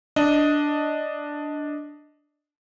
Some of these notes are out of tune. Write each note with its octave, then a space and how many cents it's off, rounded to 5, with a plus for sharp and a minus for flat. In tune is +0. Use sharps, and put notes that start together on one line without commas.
D4 +0 D#5 +5